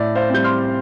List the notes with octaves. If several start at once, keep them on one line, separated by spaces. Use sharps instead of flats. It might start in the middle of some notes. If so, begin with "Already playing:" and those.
Already playing: A2 D5
C5 F5
G3 C4 G6
C6 F6